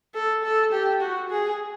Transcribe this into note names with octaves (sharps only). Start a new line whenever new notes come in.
A4
A4
G4
F#4
G#4